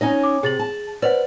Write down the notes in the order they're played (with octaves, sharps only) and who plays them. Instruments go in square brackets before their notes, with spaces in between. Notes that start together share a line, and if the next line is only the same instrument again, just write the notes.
[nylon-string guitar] C#4 D#4 D#5
[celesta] D6
[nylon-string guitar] C3 [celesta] G#4 A6 F#7
[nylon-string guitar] A5
[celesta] B4 C5 F#5 [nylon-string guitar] D5